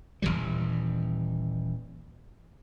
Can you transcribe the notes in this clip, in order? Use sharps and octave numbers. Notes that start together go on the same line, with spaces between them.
D#1 G#1 E3 G3